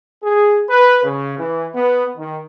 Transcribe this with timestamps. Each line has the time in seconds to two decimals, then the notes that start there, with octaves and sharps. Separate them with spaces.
0.23 G#4
0.69 B4
1.04 C#3
1.38 E3
1.74 B3
2.16 D#3